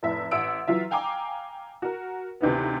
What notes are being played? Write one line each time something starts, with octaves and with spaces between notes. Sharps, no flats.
F1 A2 E5
A1 E5 F#5 E6 D7
E3 F#3 F4 E5
F5 G5 G#5 A#5 D6
F#4 A#4
D2 C3 D#3 E3 B3